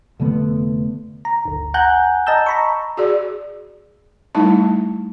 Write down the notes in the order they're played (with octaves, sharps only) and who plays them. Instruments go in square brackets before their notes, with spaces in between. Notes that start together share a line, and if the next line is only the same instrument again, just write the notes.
[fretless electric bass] F1 D3 A3 B3
[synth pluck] A#5
G1 D2
F#5 G#5 A#5 F#6 G6
D#5 A5 A#5 E6 G6
A#5 B5 C#6
[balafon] F#4 G#4 D5
G3 A3 D#4 E4 A5